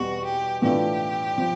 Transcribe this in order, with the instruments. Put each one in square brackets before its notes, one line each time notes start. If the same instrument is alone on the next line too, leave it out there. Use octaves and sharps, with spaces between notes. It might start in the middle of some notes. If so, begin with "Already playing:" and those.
Already playing: [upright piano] E2 B2 G3 [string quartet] F#4
[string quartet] G4
[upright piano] A2 E3 A3 D4 F4 [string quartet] G4
[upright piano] F3